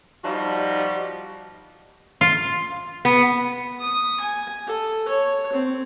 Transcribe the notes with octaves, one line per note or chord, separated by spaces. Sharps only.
F3 G3 D#4 F#4
F4
B3
D#6
G#5
A4
C#5
C4